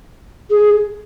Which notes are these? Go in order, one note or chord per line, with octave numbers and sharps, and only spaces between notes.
G#4